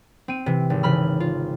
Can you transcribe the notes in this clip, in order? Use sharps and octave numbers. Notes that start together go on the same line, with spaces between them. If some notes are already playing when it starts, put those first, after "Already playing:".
C4 D#7
C3 E3
G#1
C#3 E3 B5 F6
F4